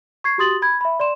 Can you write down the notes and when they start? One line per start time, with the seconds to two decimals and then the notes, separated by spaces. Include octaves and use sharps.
0.24 C#6 G#6 C7
0.38 F#4 G4 C6 D#6 A6 F#7
0.62 B5 G#6
0.81 E5 B5
1.00 D5 C6 E7